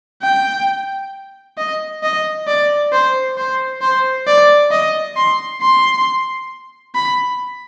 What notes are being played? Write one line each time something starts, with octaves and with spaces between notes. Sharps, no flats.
G5
D#5
D#5
D5
C5
C5
C5
D5
D#5
C6
C6
B5